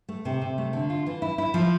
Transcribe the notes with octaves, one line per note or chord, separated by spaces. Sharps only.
A3
C3
C3
A3
D3
F4
E3
E4
E4
F3